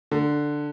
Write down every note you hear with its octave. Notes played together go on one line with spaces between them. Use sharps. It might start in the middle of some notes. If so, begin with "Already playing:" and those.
D3